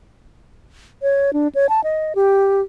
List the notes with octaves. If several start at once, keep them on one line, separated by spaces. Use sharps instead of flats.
C#5
D4
C#5
A5
D#5
G4